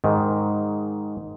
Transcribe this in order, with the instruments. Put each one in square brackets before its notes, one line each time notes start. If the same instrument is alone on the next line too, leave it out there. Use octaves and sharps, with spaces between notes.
[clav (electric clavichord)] G#2 D#3